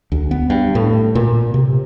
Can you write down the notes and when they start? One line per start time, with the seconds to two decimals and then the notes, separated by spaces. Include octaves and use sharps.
0.12 D2
0.31 B3
0.50 G2
0.75 A2
1.15 A#2
1.54 C3